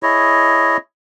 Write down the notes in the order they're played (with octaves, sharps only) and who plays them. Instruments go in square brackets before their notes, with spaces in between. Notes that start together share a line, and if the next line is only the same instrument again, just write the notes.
[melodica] E4 G#4 C#5 D#5